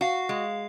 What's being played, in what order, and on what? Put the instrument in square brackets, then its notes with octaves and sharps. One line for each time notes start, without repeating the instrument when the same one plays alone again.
[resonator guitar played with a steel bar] F#4 [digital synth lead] F5
[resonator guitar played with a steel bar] G#3